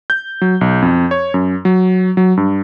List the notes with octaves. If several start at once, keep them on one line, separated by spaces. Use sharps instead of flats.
G6
F#3
B1
F2
C#5
F#2
F#3
F#3
G2